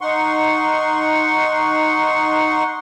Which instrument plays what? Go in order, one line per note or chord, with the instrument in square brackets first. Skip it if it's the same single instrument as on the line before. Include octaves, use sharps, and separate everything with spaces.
[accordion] D#4 F#5 C6 C#6